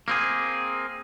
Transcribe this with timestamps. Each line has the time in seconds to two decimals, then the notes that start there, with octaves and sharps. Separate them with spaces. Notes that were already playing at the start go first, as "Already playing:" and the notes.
0.08 A#3 C4 G#4